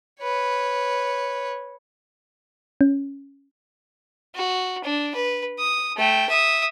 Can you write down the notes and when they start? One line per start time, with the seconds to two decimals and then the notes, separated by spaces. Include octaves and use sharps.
0.21 B4 C#5
2.81 C#4
4.35 F#4
4.84 D4
5.15 B4
5.59 D#6
5.97 A3 G5
6.29 E5 D#6